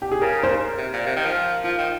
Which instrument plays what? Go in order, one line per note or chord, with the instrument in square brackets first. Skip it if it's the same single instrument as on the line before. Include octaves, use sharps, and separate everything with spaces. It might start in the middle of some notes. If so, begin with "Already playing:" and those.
[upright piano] G4
G#4
[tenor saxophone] C#3 [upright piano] A#4
[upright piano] C5
A#4
[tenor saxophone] C3
A#2
C3
D#3
F3
[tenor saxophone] F3 [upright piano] F4
[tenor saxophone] D#3